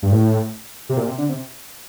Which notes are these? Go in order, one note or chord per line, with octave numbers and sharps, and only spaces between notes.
G2
A2
C3
A#2
C3
D3
C3